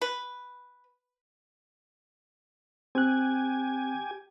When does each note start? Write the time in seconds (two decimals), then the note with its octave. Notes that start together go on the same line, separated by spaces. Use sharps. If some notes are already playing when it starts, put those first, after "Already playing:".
0.02 B4
2.95 C4 G4 G#5 F#6